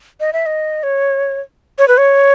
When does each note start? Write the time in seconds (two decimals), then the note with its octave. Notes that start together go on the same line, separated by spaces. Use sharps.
0.20 D#5
0.33 E5
0.46 D#5
0.83 C#5
1.78 C#5
1.88 B4
1.98 C#5